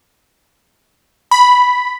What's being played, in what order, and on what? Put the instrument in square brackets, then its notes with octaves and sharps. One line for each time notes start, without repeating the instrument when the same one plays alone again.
[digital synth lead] B5